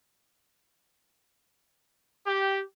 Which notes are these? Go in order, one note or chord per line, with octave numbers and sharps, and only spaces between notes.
G4